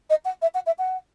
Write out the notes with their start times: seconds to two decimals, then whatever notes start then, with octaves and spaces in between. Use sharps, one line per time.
0.10 D#5
0.25 F#5
0.42 E5
0.55 F#5
0.66 E5
0.79 F#5